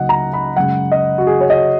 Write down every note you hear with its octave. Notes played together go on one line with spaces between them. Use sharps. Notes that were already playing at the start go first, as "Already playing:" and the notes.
Already playing: C#2 C#3 F#3 A#3 D#4 D#5 F#5
A#5
B5
F#2 C#3 G#3 F#5
D#5
F#4
G#4
C#5
D#5